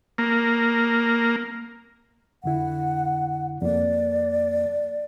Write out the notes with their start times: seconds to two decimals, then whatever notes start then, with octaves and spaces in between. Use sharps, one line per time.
0.18 A#3
2.44 F2 D3 E4 F#5
3.62 F2 A#3 D5